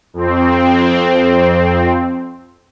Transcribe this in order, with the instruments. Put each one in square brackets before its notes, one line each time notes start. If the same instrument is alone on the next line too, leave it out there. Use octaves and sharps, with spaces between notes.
[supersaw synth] F2 C4